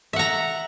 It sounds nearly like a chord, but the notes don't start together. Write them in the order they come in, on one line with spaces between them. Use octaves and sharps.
E5 F#5 A#5